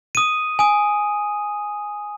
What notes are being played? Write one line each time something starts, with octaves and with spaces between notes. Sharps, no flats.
D#6 D#7
G#5 D#6